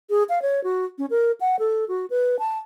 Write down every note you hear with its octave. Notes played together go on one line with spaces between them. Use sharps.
G#4
F5
C#5
F#4
C#4
A#4
F#5
A4
F#4
B4
A5